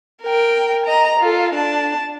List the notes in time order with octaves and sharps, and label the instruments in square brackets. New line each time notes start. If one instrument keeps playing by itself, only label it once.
[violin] A#4 G5
D#5 A#5
F4 A4
D4 A5